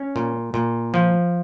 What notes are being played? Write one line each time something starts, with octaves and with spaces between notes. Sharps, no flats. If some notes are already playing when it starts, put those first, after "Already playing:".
Already playing: C#4
A#2
A#2
F3